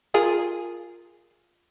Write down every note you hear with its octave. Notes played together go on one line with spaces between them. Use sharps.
F4 G#4 A#4